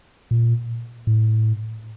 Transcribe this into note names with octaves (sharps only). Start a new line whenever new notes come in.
A#2
A2